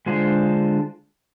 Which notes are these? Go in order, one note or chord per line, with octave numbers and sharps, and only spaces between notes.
D3 G#3 D4 F4 C5